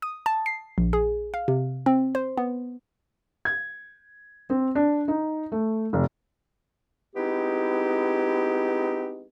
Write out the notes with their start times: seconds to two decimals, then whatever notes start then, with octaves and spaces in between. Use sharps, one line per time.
0.02 D#6
0.26 A5
0.46 C7
0.78 A#1
0.93 G#4
1.34 F5
1.48 C3
1.86 C4
2.15 C5
2.37 B3
3.45 G#6
4.50 C4
4.75 D4
5.08 D#4
5.52 A3
5.93 F1
7.15 G#3 B3 C4 D#4 E4 G4